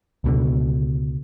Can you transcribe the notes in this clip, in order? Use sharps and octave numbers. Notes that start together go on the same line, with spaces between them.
C#2 B2 D3